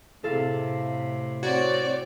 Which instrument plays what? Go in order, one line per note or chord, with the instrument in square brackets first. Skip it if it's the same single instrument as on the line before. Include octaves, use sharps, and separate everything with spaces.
[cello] A2 C3 [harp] E4 A4 F5
[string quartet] C4 C#5 D5 [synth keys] F#4 [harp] G#6 A6